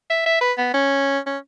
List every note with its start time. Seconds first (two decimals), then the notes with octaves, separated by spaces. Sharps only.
0.10 E5
0.26 E5
0.41 B4
0.58 B3
0.74 C#4
1.27 C#4